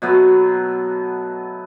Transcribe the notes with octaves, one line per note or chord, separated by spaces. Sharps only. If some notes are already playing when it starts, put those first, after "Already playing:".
B2 F#3 A3 B3